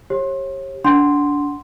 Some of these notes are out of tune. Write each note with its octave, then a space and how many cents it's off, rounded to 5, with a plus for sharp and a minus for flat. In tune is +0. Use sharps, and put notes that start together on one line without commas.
G4 +0 C#5 -35
D4 -25 F#5 +0 C6 -5